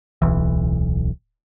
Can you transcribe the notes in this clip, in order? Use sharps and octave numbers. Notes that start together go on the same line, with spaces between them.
D1 B1 E3